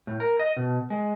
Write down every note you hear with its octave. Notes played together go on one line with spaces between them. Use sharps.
A2
A#4
D#5
B2
G#3